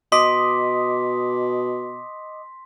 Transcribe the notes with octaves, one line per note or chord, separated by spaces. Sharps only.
B2 D#5 C6 D6 D#6 B6